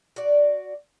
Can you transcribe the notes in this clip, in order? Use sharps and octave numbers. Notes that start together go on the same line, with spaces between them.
F#4 D5